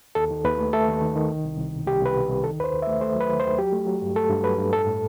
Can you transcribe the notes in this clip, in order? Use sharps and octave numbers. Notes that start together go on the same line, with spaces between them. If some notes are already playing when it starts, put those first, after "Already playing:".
D#2 A4
D#3
D#2 B4
A3
A3 A4
D#2
D#3
D#3
C2
C2
C2
B2
C2 G4
C2 B4
B2
C2
D#3 A4
D#2 B4 C5
D#2
E5
A3
A3 C5
F#3
B4
D#3
C5
D#2
F#3 G4
A3
F#3
G2
A3 A4
G2
F#3 B4
G2
A2 A4
A2